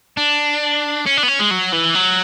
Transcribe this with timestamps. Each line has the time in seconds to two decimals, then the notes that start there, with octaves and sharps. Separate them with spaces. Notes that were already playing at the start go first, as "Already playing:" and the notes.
0.17 D4
1.06 C#4
1.17 D4
1.23 B3
1.28 C#4
1.39 G#3
1.51 F#3
1.72 E3
1.95 F#3